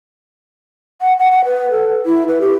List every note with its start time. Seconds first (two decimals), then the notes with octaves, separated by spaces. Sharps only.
1.01 F#5
1.19 F#5
1.31 F#5
1.45 B4
1.71 A4
2.06 E4
2.28 B4
2.41 G4